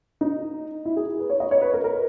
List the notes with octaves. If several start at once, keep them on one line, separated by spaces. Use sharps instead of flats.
D#4
E4
G#4
B4
C#5
D#5
C#5
B4
A#4
A#4